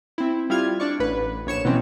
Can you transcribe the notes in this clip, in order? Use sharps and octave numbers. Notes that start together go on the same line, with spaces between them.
C4 E4
G3 E4 F4 F6 G#6
D4 D5 C#6
A1 B4
A#1 C#5 C#7 E7
B2 E3 F#3 C4 C#4